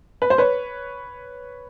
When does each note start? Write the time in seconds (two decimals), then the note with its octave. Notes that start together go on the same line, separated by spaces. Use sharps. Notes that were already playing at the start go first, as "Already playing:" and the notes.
0.22 B4
0.30 C5
0.38 B4 C#5